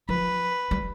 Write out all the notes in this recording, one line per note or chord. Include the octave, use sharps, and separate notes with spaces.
F3 B4
G3